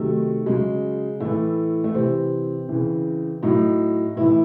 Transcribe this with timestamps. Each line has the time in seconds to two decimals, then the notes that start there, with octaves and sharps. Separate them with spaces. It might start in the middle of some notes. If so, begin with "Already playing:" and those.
Already playing: C3 D#3 F#3 A3
0.46 C#3 F#3 G#3
1.20 A2 E3 A3
1.84 A3
1.94 C3 E3 C4
2.69 C#3 E3
3.43 A2 F#3 D#4
4.16 A2 E3 E4